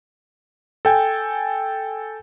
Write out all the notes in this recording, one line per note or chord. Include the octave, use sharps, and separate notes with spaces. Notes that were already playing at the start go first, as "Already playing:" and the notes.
A4 G5 G#5